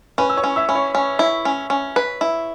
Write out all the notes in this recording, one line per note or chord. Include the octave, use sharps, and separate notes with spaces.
C#4 B4 B5
E6
C#5 C#6
C#4
E5 E6
C#4 B5
C#5 C#6
C#4
E4
C#4
C#4
B4
E4